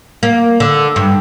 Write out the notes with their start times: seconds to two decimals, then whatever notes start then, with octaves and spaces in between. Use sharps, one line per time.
0.23 A#3
0.60 D3
0.96 G2